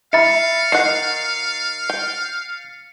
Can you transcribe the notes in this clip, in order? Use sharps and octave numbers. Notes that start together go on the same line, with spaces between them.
E5 F5 B5 A6 C#7
D#3 F#5 C7
G5